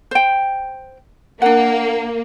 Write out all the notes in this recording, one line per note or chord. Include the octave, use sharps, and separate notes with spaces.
C5 G5
A#3 D4 F#5